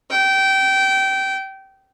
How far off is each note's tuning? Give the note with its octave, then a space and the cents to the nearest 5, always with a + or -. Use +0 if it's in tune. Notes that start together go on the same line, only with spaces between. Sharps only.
G5 -20